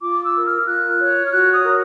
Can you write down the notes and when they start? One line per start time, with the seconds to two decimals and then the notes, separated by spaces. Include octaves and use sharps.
0.02 F4 D6
0.24 E6
0.35 A#4
0.45 F6
0.67 F4 F#6
0.98 C#5
1.26 F6
1.31 F#4 F#6
1.52 D#6
1.64 A#4